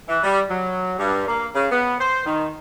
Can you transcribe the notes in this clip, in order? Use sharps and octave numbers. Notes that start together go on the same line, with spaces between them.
E3
G3
F#3
G2
A#3
C#3
B3
C5
D#3